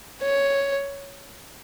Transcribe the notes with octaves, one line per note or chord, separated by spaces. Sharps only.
C#5